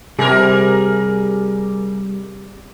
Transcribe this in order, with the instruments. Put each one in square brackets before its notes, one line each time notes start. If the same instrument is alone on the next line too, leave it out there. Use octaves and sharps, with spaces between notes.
[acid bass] C3 [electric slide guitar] G3 [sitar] G#4 A#4